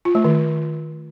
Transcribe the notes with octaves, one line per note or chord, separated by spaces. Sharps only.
F4
A3
D#3